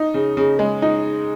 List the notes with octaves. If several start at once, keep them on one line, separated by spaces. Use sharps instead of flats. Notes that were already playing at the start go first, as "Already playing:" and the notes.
Already playing: D#4
C#3
C#3
G#3
D#4